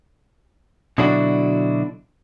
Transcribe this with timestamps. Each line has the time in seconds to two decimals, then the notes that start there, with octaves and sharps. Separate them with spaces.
0.98 B2 D3 F#3 D4 E4 F#4